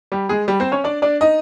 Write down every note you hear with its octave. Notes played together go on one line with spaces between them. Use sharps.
G3 G4
G#3 G#4
G3 G4
C4 C5
C#4 C#5
D4 D5
D4 D5
D#4 D#5